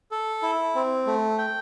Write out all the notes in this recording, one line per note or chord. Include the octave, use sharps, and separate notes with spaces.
A4
E4
C4
A3
G5